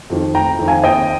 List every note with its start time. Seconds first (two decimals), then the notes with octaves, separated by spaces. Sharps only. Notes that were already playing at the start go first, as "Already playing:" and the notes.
0.10 F2 D#3
0.34 F1 G5 A#5
0.59 F2 D#3
0.68 F5 G#5
0.84 D#2 D#5 G5